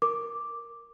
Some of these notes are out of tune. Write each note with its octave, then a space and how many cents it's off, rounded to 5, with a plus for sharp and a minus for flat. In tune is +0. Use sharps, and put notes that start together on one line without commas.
A#4 +0 D6 +0